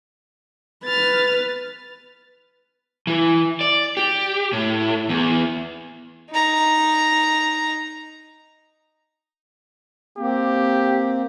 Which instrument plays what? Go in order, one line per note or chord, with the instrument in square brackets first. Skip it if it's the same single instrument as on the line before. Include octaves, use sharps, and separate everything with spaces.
[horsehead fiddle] B4 [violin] F6 A6
[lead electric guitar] E3
D5
G4
A2
E2
[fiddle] D#4 A#5
[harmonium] A#3 C4 [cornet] G4